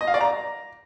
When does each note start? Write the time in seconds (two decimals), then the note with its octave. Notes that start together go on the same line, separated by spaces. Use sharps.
0.01 D#5
0.07 F5
0.14 D5
0.21 A#5